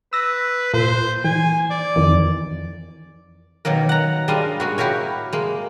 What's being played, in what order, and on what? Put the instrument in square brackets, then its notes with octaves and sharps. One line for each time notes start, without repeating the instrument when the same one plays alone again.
[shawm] B4 [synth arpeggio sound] E6 A#6
[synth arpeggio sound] A#2 [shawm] C5
[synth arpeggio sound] E3 [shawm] G#5
[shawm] D5
[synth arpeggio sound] F2 D#3 E3
[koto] B2 D#3 F#3 A#3 A#4
F#5 A#5
G3 G#3 D4 D#5 F5
G#3 A#3 F#4
E4 F#4 G4 A#4 C#5
G#3 A#3